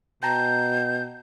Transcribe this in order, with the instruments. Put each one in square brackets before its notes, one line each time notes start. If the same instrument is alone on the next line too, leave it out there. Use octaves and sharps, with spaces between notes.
[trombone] B2 [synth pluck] G5 A5 A#5 [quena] G6